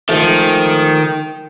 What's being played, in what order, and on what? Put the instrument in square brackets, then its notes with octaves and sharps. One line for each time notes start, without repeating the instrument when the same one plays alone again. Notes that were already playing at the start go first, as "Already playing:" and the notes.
[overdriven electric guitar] D#3 [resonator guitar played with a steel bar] F3 G#3 A3